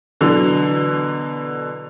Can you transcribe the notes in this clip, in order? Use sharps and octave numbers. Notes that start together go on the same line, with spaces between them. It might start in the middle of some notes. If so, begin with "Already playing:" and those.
B2 D3 E3 F#3